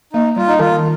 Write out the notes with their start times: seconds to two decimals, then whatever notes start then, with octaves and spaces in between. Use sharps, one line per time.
0.13 A#3 D#4
0.36 G3 F4
0.48 D#4
0.59 D#3 F4